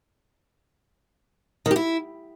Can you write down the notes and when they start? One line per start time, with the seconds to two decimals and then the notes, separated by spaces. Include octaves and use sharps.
1.66 D#3
1.71 G4
1.76 E4